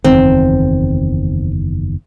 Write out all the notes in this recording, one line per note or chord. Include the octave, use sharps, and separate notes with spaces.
F#1 E2 D#3 C4